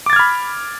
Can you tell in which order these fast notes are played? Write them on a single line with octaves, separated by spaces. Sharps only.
D6 A6 G#6 F6 B5